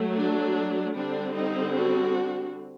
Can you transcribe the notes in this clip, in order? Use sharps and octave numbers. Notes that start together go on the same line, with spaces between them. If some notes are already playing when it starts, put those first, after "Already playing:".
Already playing: F#3 A3
D4
D3 G3 C4 D4
D#4
D4 F#4